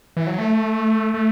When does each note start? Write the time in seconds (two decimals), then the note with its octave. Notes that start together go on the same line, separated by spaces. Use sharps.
0.17 E3
0.27 F#3
0.38 A3
1.14 A3